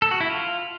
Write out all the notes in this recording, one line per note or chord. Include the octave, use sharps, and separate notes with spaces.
A4
F#4
E4
F4